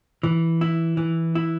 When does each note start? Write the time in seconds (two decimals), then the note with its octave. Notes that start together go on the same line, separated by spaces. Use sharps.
0.23 E3
0.61 E4
0.97 E3
1.35 E4